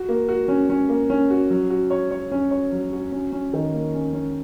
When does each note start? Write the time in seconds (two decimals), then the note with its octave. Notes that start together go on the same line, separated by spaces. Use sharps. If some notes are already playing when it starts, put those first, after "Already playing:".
Already playing: F#4
0.09 A#3
0.28 F#4
0.48 C#4
0.69 C#4
0.89 A#3
1.10 C#4
1.30 F#4
1.50 F#3
1.70 F#4
1.90 C#5
2.11 C#5
2.31 C#4
2.51 C#5
2.72 F#3
2.92 F#4
3.12 C#4
3.32 C#4
3.53 D#3
3.73 A#3
3.94 C#4
4.13 C#4